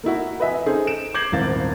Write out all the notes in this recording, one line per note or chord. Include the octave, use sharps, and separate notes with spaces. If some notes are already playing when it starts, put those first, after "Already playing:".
A#3 D#4 E4 F#4
B4 D#5 E5 G#5
C#4 D#4 G#4 A4 C5
D7 E7
D6 G6 G#6 A#6 C7 F#7
D#1 G#1 E4 F5 A6